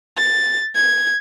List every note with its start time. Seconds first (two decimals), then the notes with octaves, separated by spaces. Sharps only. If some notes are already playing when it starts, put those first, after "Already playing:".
0.17 A6
0.75 G#6